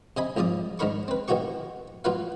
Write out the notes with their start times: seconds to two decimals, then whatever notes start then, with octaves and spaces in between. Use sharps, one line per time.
0.17 C3 D#5 G#5 B5
0.37 C2 G#2 F3 D5 D#6
0.79 G#2 D#3 D4 A#4 B5 C#6
1.08 C4 B4
1.28 A1 D#3 E3 F#4 G4 C#6
2.04 A1 F4 F#4 B4 F5